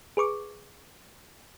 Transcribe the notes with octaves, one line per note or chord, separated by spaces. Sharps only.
G#4 B4 C#6 D6